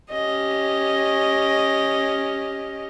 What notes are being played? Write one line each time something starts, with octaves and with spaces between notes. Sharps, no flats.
C#4 G4 D#5